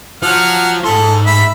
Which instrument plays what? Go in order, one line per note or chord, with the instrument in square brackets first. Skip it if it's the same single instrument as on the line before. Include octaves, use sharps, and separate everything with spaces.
[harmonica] F#3 F#5 F6 [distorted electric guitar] F4 C5
[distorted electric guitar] G#2 C6 [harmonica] A4
[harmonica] E5 B5